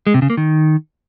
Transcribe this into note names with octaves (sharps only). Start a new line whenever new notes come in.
G#3
C3
C#3
A#3
D#3